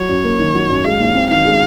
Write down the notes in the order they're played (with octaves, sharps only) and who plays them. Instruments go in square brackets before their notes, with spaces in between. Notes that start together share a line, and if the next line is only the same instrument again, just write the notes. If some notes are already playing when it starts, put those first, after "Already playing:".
Already playing: [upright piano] F#3 [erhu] C#5
[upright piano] F#2
A#3
D#3
F#3
F#2
[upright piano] G#3 [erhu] F5
[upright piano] D#2
C4
[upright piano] D#3 [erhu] F5
[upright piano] G#3